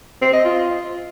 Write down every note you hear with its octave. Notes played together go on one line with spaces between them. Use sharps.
C4
D#5
F4